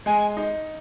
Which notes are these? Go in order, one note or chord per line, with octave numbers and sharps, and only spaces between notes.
G#3 G#5
D#4